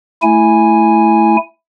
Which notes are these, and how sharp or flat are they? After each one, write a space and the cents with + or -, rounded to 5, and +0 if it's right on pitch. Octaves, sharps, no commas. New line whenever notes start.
A3 +0 E4 +0 G#5 +0